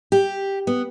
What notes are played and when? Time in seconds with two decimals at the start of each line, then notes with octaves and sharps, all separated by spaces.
0.12 G4
0.67 B3